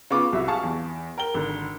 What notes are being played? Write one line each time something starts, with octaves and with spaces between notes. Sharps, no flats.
C#3 B3 F4 C#6 D6
C2 F#3 E5
G#4 F5 A5 C#6
E2
A#4 G5 G7
G#1 D3